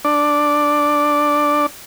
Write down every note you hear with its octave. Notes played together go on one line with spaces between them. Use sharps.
D4 D5